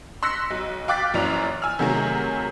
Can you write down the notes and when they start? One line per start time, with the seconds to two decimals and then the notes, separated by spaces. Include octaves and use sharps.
0.23 C6 E6 F#6 A#6 B6 C#7
0.50 B1
0.88 F5 G5 D6 F#6 A6 B6
1.14 A#1 F#2 E3 D5 F7
1.62 G#5 E6 F6
1.79 C3 D#3 F#3 A3 G#4 A#4